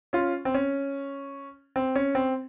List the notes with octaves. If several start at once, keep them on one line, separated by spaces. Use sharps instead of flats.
C#4 F4
C4
C#4
C4
C#4
C4